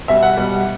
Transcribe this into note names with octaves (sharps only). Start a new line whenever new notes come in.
B2 G3 E5
F#5
B2 G3